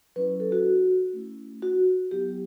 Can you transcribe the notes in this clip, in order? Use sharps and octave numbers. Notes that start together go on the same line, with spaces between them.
F#3 C#4 E4 B4
A4
F#4
A3 C#4 E4
F#4
F#3 B3 E4 G4